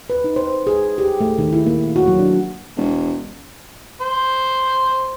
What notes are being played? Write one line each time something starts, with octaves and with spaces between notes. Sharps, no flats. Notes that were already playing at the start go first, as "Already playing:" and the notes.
B4
D#4
C5
G#4
G4
A3
D#3
E4
A#3
F#4
F#3
D4
E1
C5